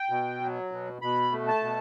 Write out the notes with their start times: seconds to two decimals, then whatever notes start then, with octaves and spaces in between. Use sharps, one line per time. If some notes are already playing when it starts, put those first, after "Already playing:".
Already playing: G5
0.10 B2
0.41 F#3
0.72 B2
1.02 B2 B5
1.32 A3
1.48 A5
1.63 B2